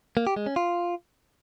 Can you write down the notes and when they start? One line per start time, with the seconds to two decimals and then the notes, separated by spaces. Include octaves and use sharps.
0.17 A#3
0.27 G4
0.36 G#3
0.46 C#4
0.56 F4